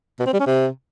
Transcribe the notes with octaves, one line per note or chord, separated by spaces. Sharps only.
B2
C4
G3
C#4
C3